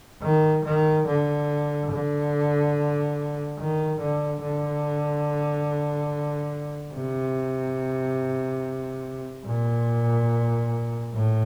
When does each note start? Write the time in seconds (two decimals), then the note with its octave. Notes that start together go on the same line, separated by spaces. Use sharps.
0.22 D#3
0.64 D#3
1.07 D3
1.91 D3
3.58 D#3
4.00 D3
4.42 D3
6.94 C3
9.45 A#2
11.14 A2